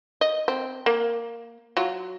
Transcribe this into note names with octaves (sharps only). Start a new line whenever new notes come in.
D#5
C4
A#3
F#3 F4